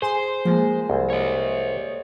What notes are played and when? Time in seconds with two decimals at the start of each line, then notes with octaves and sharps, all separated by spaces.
0.02 G#4 C5 C6
0.45 F3 G#3 A#3
0.90 C2
1.10 C#5 D#5